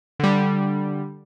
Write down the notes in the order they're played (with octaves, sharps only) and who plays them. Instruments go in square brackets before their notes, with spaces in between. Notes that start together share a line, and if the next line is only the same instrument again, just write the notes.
[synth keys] D3 G3